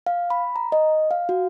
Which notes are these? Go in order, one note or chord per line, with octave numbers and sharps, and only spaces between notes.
F5
B5
A#5
D#5
F5
F#4